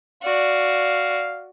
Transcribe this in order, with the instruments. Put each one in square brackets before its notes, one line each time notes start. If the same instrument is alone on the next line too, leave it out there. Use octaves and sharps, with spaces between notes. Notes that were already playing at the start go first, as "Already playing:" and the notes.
[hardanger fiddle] F#4 D5 [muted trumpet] F5